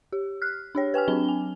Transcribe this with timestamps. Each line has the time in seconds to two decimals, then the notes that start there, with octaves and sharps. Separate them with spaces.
0.12 G4
0.42 F6 F#6
0.75 D4 G4 C#5
0.94 B4 G5 G#5 F6
1.08 F#3 C4 D4 G7
1.29 G#5